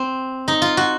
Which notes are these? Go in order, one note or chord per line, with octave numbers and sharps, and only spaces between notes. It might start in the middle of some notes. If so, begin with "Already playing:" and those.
Already playing: C4
D#4
F4
F#4